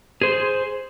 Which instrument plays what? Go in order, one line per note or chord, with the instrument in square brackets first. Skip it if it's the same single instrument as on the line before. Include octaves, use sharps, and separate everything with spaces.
[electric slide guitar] G#4 C5